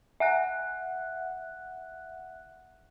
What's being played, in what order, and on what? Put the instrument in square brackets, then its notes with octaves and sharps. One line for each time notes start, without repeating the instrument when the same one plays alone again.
[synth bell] E5 F#5 F#6